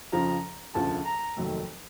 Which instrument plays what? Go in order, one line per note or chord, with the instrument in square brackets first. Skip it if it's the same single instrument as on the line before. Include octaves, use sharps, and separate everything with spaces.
[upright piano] F2 C#3 F3 [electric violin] A#5
[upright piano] E1 D2 C#3 F3 [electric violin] A5
[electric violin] A#5
[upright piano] F1 D#2 D#3 F#3 A3